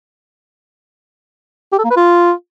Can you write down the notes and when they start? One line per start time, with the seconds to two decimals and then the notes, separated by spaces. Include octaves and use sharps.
1.72 G4
1.78 A4
1.84 A#3
1.90 B4
1.96 F4